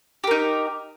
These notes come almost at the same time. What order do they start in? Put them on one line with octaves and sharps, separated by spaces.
G4 A#4 D#4